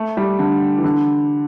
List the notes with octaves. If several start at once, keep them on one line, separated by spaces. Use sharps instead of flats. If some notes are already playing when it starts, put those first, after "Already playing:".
Already playing: A3
G3
D3
E3
D3